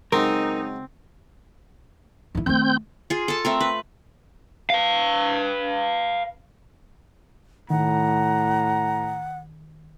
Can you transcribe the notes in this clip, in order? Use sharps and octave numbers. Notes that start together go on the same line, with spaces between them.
C#3 F#3 G#3 C4 D#4 A#4
D#3 E4
D#3 A3 C4 G6
F4 G#4
A4 A5
A3 C4 A#4
B4
B4 F5
A2 D#3 F#5 A#5